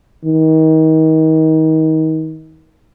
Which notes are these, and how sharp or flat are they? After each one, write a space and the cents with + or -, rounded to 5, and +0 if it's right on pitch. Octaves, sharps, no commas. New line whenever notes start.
D#3 +30